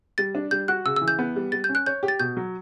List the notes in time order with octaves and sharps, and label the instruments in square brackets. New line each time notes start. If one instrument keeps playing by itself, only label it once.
[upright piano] G3 [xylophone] A6
[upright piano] D4
[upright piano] G3 [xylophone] G6
[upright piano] F#4 [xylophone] F#6
[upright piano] C#3 [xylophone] E6
[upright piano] E3 [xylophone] E6
[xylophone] G6
[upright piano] B3
G3
[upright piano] G3 [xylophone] A6
[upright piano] C#4 [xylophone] G6
[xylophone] F#6
[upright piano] C#5 [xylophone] G6
[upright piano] G4
[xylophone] A6
[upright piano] B2 [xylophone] G6
[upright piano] F#3